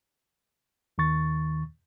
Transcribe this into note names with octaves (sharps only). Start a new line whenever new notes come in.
D#2 D#3 C#6 A6